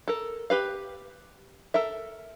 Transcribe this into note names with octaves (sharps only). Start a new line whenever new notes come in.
A4 A#4
G4 B4 F5
A4 A#4 E5